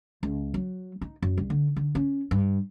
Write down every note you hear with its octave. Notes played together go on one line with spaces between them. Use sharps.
C#2
F#3
D#4
F#2
C2
D3
D3
C#4
G2